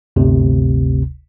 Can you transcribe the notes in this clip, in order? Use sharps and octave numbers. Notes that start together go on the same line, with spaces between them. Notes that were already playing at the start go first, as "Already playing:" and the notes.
G1 D2 C3